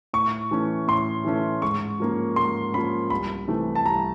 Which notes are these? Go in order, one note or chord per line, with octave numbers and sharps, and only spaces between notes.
A2 C#6
E3 A3 C#4
A2 C6
E3 A3 C#4
G#2 C#6
F3 A#3 C#4
G#2 C6
F3 A#3 C#4 B5
C2 B5
C3 E3 A3
A5
C2 A#5